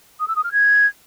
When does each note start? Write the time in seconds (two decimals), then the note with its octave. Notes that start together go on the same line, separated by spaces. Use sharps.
0.20 D#6
0.28 E6
0.36 D#6
0.44 F6
0.52 G#6